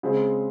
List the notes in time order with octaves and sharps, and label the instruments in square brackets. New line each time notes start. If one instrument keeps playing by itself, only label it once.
[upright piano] C#3 G#3 C4